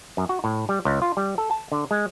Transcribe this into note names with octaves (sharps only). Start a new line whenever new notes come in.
F#2
F#4
A2
G3
C#2
F4
G3
A4
A5
D3
G#3